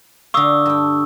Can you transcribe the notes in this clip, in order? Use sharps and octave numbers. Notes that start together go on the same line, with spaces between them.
D3 F5 C#6 D#6 E6
G2 G5